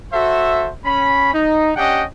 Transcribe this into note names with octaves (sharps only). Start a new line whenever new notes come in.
F#4 A4 C5 E5
C#4 B5
D#4
C#4 D4 G4 D#5 F#5 G5